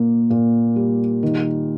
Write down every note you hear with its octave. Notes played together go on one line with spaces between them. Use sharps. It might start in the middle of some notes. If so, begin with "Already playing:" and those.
Already playing: A#2 A#3
A#2
G3
D#3